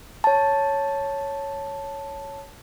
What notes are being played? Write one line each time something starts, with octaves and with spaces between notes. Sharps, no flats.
C#5 A5